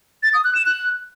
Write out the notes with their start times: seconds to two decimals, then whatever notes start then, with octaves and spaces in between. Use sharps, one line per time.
0.23 A6
0.34 D#6
0.44 F#6
0.55 E7
0.66 F#6